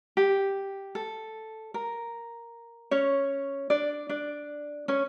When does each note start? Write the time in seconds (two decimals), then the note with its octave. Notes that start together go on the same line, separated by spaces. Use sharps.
0.17 G4
0.95 A4
1.74 A#4
2.91 C#4 C#5
3.70 D4 D5
4.09 D4 D5
4.88 C#4 C#5